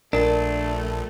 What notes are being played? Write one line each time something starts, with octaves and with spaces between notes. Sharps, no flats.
A#1 A3 D4 A#4